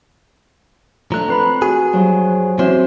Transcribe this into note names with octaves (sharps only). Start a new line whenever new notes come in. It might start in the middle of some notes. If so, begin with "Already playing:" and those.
F3 A3 D4 A#5 F#6
C4 B4 B5
F#4 G#4
G2 F3 F#3
E3 C4 C#4 F#4 C5 E5